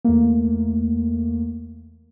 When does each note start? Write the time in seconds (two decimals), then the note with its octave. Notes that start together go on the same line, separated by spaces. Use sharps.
0.05 E2 A3 A#3